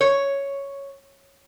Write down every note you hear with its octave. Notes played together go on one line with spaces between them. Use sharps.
C#5